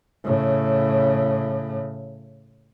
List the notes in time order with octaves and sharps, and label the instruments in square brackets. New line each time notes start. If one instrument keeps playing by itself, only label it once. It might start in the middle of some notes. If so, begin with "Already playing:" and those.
[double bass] A2 C#3